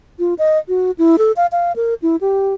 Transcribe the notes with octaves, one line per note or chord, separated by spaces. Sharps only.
F4
D#5
F#4
E4
A4
F5
F5
A#4
E4
G4